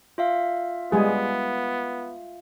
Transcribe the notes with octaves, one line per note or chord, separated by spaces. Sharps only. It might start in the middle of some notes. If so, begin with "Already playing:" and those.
F4 E5 F5
G3 G#3 B3 G#4